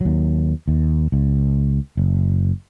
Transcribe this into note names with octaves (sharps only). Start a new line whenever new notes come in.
D#2 F#3
D#2
C#2
F#1